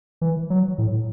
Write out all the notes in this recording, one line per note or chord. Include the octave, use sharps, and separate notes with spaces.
E3
F#3
A2